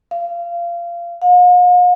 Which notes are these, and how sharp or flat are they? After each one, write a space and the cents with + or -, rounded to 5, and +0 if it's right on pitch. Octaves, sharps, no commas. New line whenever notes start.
F5 -25
F5 +45